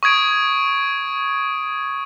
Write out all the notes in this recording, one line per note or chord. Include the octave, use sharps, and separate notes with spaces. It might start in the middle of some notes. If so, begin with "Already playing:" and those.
C#6 D#6 G#6 D7